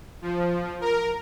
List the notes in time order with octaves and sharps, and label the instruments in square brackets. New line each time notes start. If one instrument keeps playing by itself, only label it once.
[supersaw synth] F3
A#4